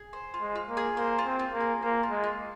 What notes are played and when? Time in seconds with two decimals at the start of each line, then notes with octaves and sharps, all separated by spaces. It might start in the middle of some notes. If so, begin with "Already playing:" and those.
Already playing: G#4
0.13 C5
0.34 F4
0.41 G#3
0.55 F4
0.69 A#3
0.77 G#4
0.97 A#3 C5
1.19 F4
1.25 C4
1.39 F4
1.54 A#3
1.60 G#4
1.82 A#3 C5
2.03 F4
2.10 G#3
2.24 F4